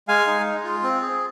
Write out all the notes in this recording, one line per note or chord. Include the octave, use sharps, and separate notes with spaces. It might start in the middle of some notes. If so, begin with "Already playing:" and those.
G#3 F5 G#5
D#4
G#3
F4
C4
G#4